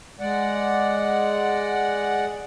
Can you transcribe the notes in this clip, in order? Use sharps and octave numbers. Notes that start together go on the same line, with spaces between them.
G#3 D5 F#5